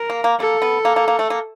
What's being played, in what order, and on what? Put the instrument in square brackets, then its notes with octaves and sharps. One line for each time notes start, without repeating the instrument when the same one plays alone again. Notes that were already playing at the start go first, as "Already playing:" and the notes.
Already playing: [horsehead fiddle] A#4
[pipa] A#3
A#3
[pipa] A#3 [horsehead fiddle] A4
[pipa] B3
A#3
A#3
A#3
A3
A#3